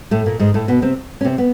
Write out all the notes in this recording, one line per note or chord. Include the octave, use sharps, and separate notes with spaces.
A2 A3
A#2 A#3
G#2 G#3
A2 A3
B2 B3
C3 C4
C#4
C3 C4
B3